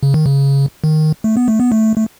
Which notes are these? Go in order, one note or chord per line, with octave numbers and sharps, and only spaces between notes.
C#3
D#3
C#3
D#3
A3
B3
A3
B3
A3
A3